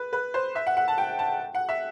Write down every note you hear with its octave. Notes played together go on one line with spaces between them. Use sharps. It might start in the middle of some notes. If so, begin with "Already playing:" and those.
Already playing: B4
B4
C5
E5
F#5
F#5
A5
G5
A5
F#5
E5